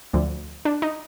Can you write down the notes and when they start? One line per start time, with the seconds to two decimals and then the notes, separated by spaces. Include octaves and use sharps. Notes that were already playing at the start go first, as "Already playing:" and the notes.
0.13 D2 D3 F3
0.65 D4
0.82 D#4